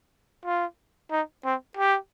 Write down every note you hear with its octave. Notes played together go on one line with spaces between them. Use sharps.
F4
D#4
C4
G4